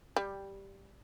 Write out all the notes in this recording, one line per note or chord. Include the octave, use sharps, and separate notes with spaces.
G3